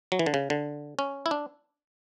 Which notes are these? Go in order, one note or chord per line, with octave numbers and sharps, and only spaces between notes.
F#3
E3
D3
C#3
D3
C#4
E4
D4